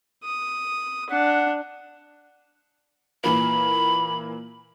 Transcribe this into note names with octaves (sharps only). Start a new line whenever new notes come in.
D#6
D4 F#5
A#2 E3 A#3 B5